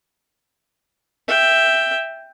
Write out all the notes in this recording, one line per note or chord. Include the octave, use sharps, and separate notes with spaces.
E5 G5